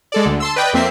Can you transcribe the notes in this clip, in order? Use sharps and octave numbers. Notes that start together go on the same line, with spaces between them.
G#3 A4 D5
D2 D3
A5 C6 E6
B4 D5 D#5 G5
F2 A#3 C4 E5 C7